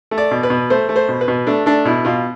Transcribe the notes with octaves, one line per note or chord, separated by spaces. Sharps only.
A3
D5
B2
B4
B2
A3 C5
A3
C5
B2
B4
B2
A3 D4
A3 D4
B2 E4
B2 F4